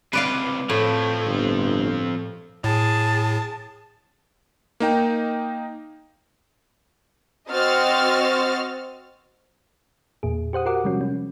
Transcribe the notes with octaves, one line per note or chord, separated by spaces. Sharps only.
C#2 C3 B4 D5 F5
A2 F3 C4
G1
A2 G#4 A5
A#3 D#4 G5
C4 F#4 C5 D#5 F6 A6
E2 A#2 G#4
G4 C5 F#5 D#6
F#4 G4 A#4 F#5 D6
C3 F3 G3 G#3 C#4 F#4
F3 C#4